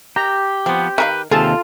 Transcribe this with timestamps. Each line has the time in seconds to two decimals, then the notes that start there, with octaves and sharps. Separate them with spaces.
0.16 G4 A#5
0.66 F3 B3 C4
0.98 D#3 A#4 B4 F5
1.31 D#2 C3 D#3 F4 G#4 A4 A5